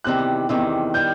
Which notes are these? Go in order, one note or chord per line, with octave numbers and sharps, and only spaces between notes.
E2 C3 D#3 G3 F#6
E2 C3 D#3 G3
D#3 G3 G6